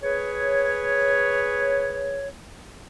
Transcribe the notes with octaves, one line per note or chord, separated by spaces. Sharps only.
G#4 B4 C#5